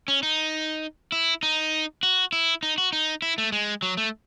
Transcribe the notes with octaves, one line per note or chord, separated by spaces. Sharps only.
C#4
D#4
E4
D#4
F#4
E4
D#4
F#4
D#4
E4
A3
G#3
F#3
A3